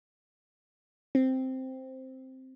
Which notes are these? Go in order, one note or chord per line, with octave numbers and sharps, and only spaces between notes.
C4